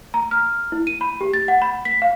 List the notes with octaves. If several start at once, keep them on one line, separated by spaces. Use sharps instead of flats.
A#5
F6
E4
D#7
B5
G4
A6
F#5
B5
B6
F5